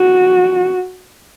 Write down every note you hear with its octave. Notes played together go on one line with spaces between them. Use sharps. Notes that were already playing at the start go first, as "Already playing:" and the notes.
Already playing: F#4